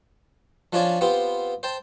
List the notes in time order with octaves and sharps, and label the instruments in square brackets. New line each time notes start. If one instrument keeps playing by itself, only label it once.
[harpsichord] F3 C#4 D4 F4 C#5 D5
B3 C4 F4 G4
C5 G5 A5